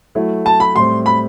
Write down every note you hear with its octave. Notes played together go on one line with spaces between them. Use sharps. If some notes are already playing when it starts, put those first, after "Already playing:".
F#3 A3 E4
A5
B5
A2 G3 C4 C6
B5